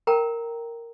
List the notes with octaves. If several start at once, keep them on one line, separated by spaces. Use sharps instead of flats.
A#4 G5 A#5